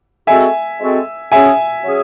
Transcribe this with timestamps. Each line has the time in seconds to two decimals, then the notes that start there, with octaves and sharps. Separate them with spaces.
0.27 G#3 C4 F#4 A4 E5 G#5
0.80 G#3 C4 F#4 A4
1.32 F#3 C#4 G#4 E5 G#5
1.84 F#3 C#4 G#4